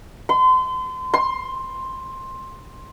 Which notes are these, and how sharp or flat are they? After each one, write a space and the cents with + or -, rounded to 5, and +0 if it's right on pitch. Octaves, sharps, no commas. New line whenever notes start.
C6 -35
C6 +10